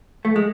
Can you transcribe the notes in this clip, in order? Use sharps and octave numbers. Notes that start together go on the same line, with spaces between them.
A3
G#3